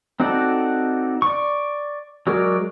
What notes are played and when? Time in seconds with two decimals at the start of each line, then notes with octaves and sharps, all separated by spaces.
0.20 C4 D#4 F#4 A4 D5
1.22 D5 C#6
2.27 F#3 G#3 F#4 A#4 D5